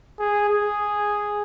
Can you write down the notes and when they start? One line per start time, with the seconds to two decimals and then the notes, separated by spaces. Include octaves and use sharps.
0.19 G#4
0.49 G#4